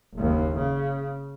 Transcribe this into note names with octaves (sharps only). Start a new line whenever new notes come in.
F#1 D#2
C#3